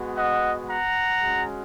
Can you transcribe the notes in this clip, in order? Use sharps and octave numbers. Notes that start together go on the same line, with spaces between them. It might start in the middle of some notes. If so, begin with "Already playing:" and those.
Already playing: G#3 B3 F#4
D#5 F#5
F#5 A#5
G#3 C#4 F#4